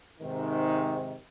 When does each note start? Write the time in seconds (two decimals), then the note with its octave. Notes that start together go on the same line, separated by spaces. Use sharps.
0.19 G#2 C3 D#3